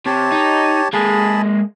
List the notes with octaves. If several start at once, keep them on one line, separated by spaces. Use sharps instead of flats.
C3 G4 C#5 A5
D#4
G#3 A#3 G#4 A5 B5